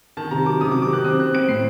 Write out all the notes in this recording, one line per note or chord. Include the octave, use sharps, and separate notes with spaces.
D#3 A5
C3 A#5
F#3 D6
C3 D#6
D6
C3
D6
D#3 F#6
C4 D#6
C4 F#6
C4 D7
A2 C7